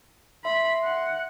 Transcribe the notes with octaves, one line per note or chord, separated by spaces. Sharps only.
E5 B5 C6
F#5